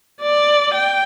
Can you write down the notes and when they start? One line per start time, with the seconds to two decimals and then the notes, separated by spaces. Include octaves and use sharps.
0.21 D5
0.73 G5